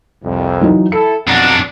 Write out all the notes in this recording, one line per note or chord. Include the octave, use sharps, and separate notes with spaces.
C2 F2
E3 F#3 D#4
E4 A4 C#7
B1 F2 D4 F#5 A#5